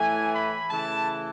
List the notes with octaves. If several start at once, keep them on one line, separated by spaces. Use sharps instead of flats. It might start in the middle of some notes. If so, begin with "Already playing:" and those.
Already playing: A2 E3 A3 G#5
B5
C#3 E3 A3 A5